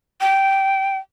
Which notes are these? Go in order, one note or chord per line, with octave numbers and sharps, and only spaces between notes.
G5